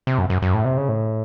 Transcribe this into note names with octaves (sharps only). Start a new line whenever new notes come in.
C3
F#2
F#2
F#2
A2
C3
C#3
A2